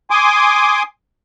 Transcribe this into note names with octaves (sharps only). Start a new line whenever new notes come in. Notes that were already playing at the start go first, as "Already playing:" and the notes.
G#5 C6 D6 D#6